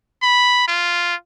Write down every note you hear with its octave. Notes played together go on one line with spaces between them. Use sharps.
B5
F4